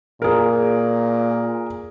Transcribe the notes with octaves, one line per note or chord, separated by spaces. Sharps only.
A#2 G#4 A#4